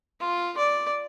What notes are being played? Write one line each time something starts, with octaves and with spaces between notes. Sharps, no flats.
F4
D5